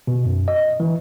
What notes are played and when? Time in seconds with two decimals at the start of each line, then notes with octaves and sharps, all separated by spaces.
0.07 B2
0.25 F#2
0.48 D#5
0.80 E3